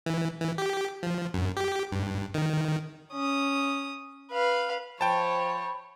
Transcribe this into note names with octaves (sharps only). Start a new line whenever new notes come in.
E3
E3
G4
F3
F#2
G4
G2
D#3
C#4 D#6
B4 F5
F3 C5 C#5 G5 A5 B5